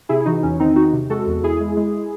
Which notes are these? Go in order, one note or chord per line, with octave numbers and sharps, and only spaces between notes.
C3 E4 G#4
E4
E3 D#4 F#4
E2 C#4
D#3 C4 D#4
E2 D#4 F#4
C3
G#3 F#4 A4
E2
E2 E4 G#4
G#3
G#3